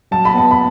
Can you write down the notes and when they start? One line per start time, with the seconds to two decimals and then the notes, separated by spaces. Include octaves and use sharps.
0.11 F#3 A5
0.25 B5
0.34 B3 A5
0.51 B5